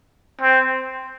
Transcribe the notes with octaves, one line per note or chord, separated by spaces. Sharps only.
C4